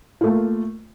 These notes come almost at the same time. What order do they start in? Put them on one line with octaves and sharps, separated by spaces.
F4 A3 A#3